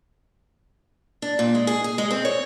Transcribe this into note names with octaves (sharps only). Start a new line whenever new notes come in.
D4
A#2
G#3
G#4
G#4
G#3
C4
C#5